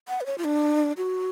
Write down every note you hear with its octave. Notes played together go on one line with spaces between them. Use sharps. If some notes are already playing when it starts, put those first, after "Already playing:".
F#5
B4
C#5
F4
D4
F#4